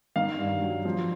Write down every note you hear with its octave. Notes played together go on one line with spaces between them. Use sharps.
D#3 F5
G2
F#3
F3